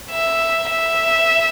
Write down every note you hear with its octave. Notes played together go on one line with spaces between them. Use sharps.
E5
E5